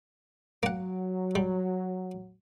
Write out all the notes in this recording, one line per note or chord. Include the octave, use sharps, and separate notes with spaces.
F#3 A#3 F#5
G3